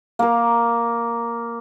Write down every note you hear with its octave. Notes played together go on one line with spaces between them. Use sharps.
A#3 A#4